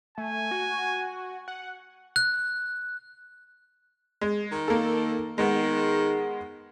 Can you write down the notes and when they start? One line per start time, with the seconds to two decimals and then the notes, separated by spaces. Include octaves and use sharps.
0.18 A3 G#5
0.51 F#4
1.48 F#5
2.16 F#6
4.21 G#3
4.51 D#3
4.68 A#3 A4
5.38 D#3 G#3 B3